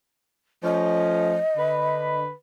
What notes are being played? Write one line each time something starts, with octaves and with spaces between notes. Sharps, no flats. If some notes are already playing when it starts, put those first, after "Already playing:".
F3 A3 C#4 D#5
D3 B4 B5